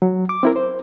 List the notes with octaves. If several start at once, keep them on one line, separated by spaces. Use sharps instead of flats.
F#3
D6
C4 E4 A#4
C5